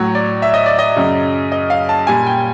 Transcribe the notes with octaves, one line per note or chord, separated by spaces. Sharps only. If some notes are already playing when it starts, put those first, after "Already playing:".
Already playing: A2 F#3 C#5
D5
E5
D#5
D5
D#5
F#2 C#3 F#3
D#5
F5
A5
A#2 G3 G#5
G5